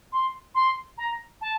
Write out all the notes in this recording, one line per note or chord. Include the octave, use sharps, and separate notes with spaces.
C6
C6
A#5
A5